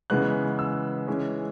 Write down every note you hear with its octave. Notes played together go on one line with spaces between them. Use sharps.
C#3 E3 G#3 B3 F#6
E6
E3 G#3 C#4